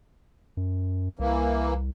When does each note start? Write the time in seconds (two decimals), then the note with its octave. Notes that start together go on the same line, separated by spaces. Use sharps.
0.57 F#2
1.19 C2 E3 A#3